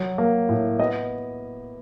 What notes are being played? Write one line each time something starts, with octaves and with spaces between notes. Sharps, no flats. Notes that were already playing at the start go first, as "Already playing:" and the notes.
Already playing: F#3
A#3
A2
B3 D#5